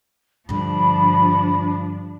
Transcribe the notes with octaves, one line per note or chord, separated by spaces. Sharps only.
G2 D3 F3 D4 B5